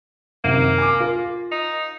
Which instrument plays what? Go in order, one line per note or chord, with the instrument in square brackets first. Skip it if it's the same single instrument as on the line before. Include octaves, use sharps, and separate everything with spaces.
[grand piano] F#2 C3 D#3 [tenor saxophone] A#3
[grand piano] G#5 D6
F4 A#4
[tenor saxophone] D#4